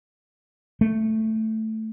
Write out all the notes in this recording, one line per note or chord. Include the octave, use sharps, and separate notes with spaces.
A3